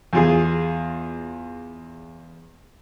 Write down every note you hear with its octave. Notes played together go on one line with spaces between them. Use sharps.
E2 F4 G#4